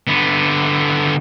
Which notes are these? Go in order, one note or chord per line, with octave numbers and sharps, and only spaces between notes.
D3 B3